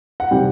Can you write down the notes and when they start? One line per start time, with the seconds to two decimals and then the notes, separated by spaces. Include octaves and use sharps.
0.20 F#5
0.31 C3 D#3 G3 C4 G5